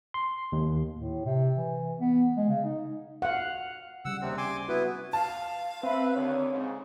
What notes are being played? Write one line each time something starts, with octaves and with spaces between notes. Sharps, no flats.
C6
D#2
A2
C3
E3
B3
G#3
C#3
D#4
F5 F#5
C#3 G3 F#5 E6
D#2 C3 C4
G#5 C6 D6
B3 E4 F#4 B4
F5 A5
C4 B4 E5
D#2 D3 C#5
G#2 C#3